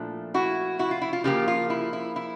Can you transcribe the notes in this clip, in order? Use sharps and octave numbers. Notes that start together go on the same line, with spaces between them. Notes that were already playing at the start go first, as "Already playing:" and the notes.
Already playing: A#2 F3 A3 D4 E4
E4 F#4
E4 F#4
F4
E4
F4
C#3 F3 A#3 F4 G4
F4
E4
E4
E4